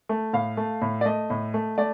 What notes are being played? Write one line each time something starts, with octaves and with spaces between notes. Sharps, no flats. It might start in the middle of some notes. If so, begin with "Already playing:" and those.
A3
A2 F5
A3
A2
D5
A3 D#5
A2
A3
A3 D5